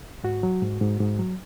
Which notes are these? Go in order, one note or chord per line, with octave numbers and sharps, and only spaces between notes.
G#2 F#4
F#3
G#2
G#2
G#2
F#3